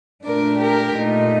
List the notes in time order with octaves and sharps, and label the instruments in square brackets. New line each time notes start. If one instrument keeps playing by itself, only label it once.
[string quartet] A#2 A3 D4 A#4 D5
G4 A#4
A#2 A3 D#4